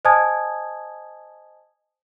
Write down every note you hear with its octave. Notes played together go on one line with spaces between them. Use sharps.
C5 D#5 G#5 A5 D#6 G#6